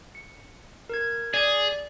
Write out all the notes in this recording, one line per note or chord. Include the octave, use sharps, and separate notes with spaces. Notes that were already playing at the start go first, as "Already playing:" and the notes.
C#7
A#4 G#6
G#4 D5